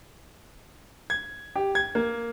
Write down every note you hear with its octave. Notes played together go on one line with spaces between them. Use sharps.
G#6
G4
G#6
A#3